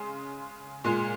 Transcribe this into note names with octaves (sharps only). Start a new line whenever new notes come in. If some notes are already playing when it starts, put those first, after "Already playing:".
Already playing: C#3 G#3 C6
A#2 G#3